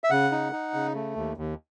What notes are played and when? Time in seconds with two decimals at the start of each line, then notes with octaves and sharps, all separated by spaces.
0.04 E5
0.10 C#3 F#5
0.32 D#4
0.53 D#4
0.74 C#3
0.95 A3
1.16 D#2
1.37 D#2